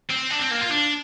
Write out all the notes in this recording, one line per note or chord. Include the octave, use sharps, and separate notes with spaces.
C4
D4
C4
A#3
F4
D4